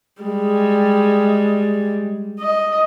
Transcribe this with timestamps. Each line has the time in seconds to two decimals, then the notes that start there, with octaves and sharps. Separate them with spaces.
0.22 G3 G#3
2.40 D#5